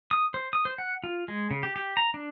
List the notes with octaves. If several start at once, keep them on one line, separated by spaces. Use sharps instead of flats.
D#6
C5
D#6
C5
F#5
F4
G#3
C#3
G4
G4
A#5
D4